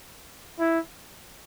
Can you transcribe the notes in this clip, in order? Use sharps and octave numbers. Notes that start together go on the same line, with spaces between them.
E4